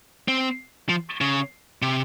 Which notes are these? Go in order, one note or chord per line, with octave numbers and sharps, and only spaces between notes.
C4
F3
C#3
C3